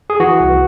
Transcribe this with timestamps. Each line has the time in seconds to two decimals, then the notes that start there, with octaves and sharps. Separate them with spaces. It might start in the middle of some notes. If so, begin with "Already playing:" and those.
0.10 G#4
0.20 E3 F#4
0.40 C2